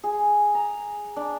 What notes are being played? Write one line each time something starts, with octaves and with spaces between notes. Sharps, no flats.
G#4
A#5
D4